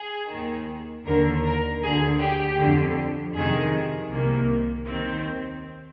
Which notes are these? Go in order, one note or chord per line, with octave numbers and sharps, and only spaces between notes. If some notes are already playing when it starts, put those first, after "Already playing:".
Already playing: G#4
D#2 D#3
D#2 D3 A#4
A#4
D2 D3 G#4
G4
F2 D3
F2 C3 D#3 G#4
C2 C3 D#3 A#3
D#2 D#3 C4